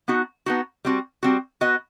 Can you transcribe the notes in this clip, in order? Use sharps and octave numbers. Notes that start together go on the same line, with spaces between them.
B3 D#4 F#4
B3 D#4 F#4
G3 C4 F#4
G3 C4 F#4
B3 F#4 B4 D#5